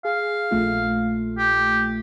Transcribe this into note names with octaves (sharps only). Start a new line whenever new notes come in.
G#4 F5
A#1 A3 F4
G4